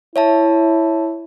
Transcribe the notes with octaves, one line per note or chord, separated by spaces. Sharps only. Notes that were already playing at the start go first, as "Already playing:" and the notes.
E4 C#5 E5 A5